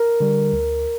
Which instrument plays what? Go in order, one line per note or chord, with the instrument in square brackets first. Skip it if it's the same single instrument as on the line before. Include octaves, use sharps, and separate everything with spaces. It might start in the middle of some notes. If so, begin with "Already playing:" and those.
Already playing: [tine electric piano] A#4
D3 G3
D2